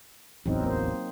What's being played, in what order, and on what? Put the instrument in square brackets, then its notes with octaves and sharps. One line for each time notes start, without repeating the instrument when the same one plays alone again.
[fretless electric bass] D1 A1 E2 [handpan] F#3 C4 D#4
[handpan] A#3 C5